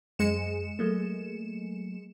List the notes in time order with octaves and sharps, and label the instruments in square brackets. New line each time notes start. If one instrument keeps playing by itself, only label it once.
[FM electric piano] F#2 [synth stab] G#3 C#7 E7
[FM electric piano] F#3 A3 A#3